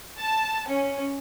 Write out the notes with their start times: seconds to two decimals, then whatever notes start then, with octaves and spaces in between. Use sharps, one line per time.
0.18 A5
0.68 C#4